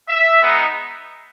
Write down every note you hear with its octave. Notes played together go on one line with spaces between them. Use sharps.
E5
G#3 B3 D#4